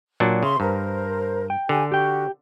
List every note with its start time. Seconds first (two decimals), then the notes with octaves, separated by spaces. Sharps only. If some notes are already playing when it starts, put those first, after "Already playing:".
0.20 A#2 F#3 D4
0.43 C#3 E5 C6 C#6
0.60 G2 A#4 C5
1.50 G5
1.69 D3 G4 G#5
1.92 F#4 G4 G5